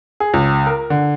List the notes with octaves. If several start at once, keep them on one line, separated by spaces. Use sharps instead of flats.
G#4
C#2
A#4
D3